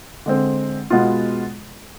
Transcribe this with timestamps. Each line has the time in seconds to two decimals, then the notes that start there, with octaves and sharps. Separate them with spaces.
0.26 D3 G#3 C4
0.90 B2 G#3 B3 F4